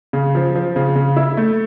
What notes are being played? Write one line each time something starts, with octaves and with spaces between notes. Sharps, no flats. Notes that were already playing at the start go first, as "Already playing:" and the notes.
C#3
F3
F3
C#3
C#3
E4
A3